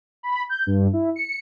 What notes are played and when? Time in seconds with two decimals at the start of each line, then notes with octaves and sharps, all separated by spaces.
0.23 B5
0.49 G6
0.66 G2
0.93 E4
1.16 C#7